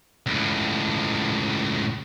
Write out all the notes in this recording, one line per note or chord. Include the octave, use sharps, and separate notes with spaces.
C#2 A2